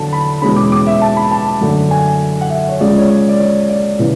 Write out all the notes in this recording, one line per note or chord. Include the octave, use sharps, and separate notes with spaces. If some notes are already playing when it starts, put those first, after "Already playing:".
Already playing: E2 D3 F#3 A5
B5
E2 B2 G#3 C#4 B5
D6
D6
E5
A5
B5
A5
F#2 D3 A3
G#5
F#5
E5
C#5
C#2 C#3 G#3 D5
C#5
D5
D5
C#5
D5
C#3 E3 B3